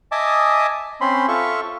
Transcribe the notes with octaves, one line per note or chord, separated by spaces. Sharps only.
D#5 E5 G#5 A5 D6 D#6
C4 C#4 B5 C6
F4 A4 E5 C#6